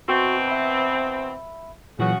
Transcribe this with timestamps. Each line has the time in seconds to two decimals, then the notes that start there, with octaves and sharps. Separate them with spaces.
0.08 B2 E3 C4 F#4 C6 C#6
0.48 E5 B5
1.99 A#2 C#3 E3 F#3 F#4